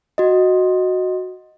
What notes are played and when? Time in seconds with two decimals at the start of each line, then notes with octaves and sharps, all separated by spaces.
0.18 F#4 D#5